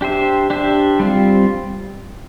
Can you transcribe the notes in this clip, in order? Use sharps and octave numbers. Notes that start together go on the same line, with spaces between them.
D4 G4 C5 E5
D4 G4 C5 E5
G3 C4 F4